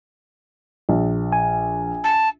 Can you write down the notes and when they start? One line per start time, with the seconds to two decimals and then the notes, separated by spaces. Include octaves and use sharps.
0.89 A#1
1.33 G#5
2.04 A5